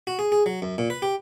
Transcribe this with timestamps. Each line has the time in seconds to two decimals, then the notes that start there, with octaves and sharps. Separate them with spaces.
0.07 F#4
0.19 G#4
0.32 G#4
0.46 F#3
0.62 F#2
0.78 A#2
0.90 B4
1.02 G4